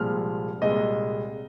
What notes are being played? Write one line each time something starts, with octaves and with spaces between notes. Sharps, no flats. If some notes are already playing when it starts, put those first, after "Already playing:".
Already playing: C2 A#2 F3 G#3 F6
C2 A#2 G#3 D#5